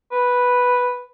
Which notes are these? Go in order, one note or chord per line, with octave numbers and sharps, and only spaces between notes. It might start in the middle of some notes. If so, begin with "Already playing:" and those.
B4